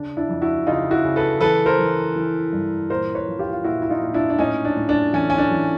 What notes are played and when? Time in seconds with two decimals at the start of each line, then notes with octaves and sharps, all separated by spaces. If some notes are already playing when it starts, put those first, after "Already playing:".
Already playing: C#3 D4
0.17 D4 E4
0.29 F2
0.42 E4 F#4
0.67 C#3 D#4 F4
0.91 E4 F#4
1.04 C#3
1.16 A4 B4
1.41 E3 A4 B4
1.66 A#4 C5
1.79 E3
2.16 E3
2.53 G2
2.90 A#2 A#4 C5
3.15 B4 C#5
3.28 F3
3.39 F4 G4
3.53 F4
3.64 A#2 E4 F#4
3.82 E4
3.89 D#4 F4
4.02 A#2
4.14 D4 E4
4.30 D4
4.39 A2 C#4 D#4
4.65 D4
4.76 A2
4.89 D4
5.13 E3 C#4
5.30 C#4
5.38 D4
5.51 E3